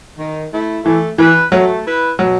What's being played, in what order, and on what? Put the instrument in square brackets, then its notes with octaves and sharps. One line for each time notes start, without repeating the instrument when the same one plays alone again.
[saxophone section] D#3
A3 E4
[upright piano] E3 [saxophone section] A3
[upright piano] E3 [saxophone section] E4 B4
[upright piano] F#3 [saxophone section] A3
[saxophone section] E4 B4
[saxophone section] B2 [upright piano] F#3